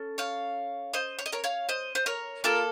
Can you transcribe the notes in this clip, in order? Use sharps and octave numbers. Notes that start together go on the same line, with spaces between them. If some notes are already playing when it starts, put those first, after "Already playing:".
Already playing: C#4 A4
C#5 F5
C5 D#5
C#5
D#5
A#4 C#5
C#5 F5
C5 D#5
C5
A#4 C#5
A#3 F4 A4 A#4